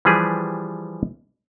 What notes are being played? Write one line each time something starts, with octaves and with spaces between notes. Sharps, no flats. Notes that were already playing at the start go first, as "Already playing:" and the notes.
E3 F3 G3 G4 G#4 B4